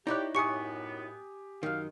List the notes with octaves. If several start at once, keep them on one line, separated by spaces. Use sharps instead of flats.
D#4 E4 G4 C#5 D5 F#6
F#2 A2 B3 G4 G#5 C#6 D#6 C#7
F#2 D#3 F5